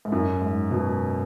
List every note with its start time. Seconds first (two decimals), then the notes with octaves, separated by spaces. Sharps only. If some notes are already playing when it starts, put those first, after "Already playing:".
0.05 G#2
0.12 F#2
0.42 G#2
0.71 B2